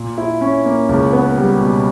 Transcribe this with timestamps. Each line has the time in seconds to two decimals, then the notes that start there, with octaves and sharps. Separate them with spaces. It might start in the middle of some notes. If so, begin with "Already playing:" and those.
Already playing: A#2
0.18 E4
0.41 C#4
0.66 A#3
0.89 C#2
1.13 B3
1.37 G3
1.61 B2